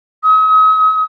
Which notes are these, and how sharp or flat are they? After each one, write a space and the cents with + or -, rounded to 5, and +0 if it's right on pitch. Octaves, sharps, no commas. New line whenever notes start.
D#6 +40